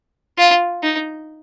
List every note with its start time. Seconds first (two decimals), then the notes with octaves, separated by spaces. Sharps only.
0.38 F4
0.83 D#4